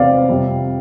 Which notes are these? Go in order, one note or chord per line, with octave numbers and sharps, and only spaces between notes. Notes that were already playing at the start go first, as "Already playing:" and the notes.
Already playing: E2 C3 C4 D5 F5
F2 C3 G3